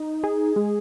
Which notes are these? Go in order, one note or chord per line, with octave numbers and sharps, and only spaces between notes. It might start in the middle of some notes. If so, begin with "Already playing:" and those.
Already playing: D#4
G#4
G#3